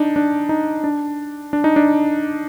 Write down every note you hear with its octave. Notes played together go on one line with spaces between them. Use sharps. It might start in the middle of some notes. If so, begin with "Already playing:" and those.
Already playing: D4 D#4
D4
D#4
D4
D4
D#4
D4